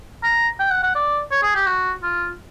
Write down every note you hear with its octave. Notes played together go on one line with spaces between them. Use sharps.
A#5
G5
F#5
F#5
D5
C#5
G#4
G4
F#4
F4